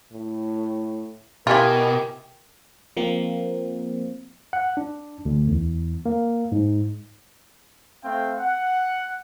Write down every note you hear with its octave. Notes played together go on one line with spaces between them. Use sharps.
A2
B2 E4 F4 G4 A#4 G#5
F3 A#3 C4
F#5
D4
D2
E2
A#3
G#2
A3 C4 F5 G5
F#5